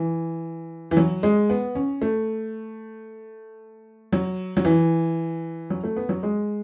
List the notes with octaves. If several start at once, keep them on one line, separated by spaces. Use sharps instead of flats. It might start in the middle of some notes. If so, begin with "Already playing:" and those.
Already playing: E3
E3
F#3
G#3
B3
C#4
A3
F#3
F#3
E3
F#3
A3
B3
F#3
G#3